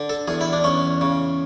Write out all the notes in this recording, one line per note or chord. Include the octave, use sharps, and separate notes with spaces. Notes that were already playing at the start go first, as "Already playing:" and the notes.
Already playing: D3
A4
E2 G#4
E4
D4
E2 C#4
C#3